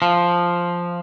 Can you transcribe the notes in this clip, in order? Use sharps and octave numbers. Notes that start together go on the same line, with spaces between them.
F3